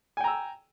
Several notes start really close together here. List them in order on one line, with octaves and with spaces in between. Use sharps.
G#5 G5 A#5 E6